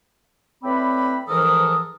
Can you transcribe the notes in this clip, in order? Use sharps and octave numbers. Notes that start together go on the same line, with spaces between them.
A2 C4 B4 D5 B5
G#2 E3 F3 A4 A#4 D#6